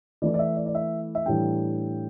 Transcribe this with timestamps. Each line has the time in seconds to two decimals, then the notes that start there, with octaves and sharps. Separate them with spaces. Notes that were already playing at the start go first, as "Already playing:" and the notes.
0.22 E3 A3 E4 D5
0.34 D5
0.39 E5
0.56 D5
0.66 D5
0.75 E5
1.15 E5
1.26 A2 E3 G3 D4 G5